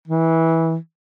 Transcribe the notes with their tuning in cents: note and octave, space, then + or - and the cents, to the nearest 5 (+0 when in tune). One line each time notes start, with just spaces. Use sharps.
E3 -15